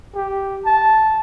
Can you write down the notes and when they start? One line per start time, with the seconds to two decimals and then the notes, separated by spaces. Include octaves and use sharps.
0.16 G4
0.66 A5